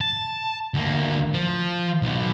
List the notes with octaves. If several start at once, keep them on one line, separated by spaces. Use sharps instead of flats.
A5
D2 A#3
F3
B1 B2